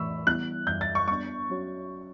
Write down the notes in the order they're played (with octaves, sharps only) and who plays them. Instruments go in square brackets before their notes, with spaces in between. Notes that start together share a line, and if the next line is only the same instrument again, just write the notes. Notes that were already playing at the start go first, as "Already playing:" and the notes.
Already playing: [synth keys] A2 E3 A3 [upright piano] B5 C#6 E6
[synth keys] E3 G3 B3 E4 [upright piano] F#6
[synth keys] F#2 E3 G3 [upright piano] G6
[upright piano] A6
C#6
[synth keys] G3 B3 D4 [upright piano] C#6
[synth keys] F#3 C#4 F#4 C#5